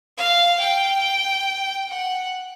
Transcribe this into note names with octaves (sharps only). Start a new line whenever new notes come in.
F5
G5
F#5